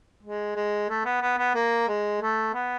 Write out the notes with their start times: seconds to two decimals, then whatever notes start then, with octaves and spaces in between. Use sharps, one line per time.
0.23 G#3
0.56 G#3
0.89 A3
1.05 B3
1.21 B3
1.38 B3
1.55 A#3
1.88 G#3
2.21 A3
2.53 B3